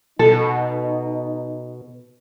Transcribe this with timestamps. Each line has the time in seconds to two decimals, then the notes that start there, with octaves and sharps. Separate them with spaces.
0.19 B2 D#4 A4